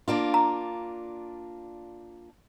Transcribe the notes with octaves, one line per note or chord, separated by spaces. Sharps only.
A#3 D4 F4
A#5